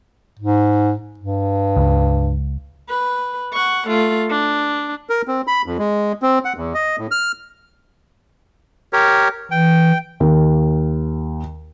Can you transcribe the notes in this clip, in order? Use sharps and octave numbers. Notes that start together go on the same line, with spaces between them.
G#2
G2
C#2
B4
F#5 C#6
A3 F4
D4
A#4
C4
B5
F2
G#3
C4
F#5
E2
D#5
A2
F6
G4 A#4 C#5
E3 G5
D#2